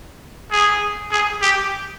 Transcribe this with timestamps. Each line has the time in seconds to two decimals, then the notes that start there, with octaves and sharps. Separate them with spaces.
0.51 G#4
1.11 G#4
1.42 G4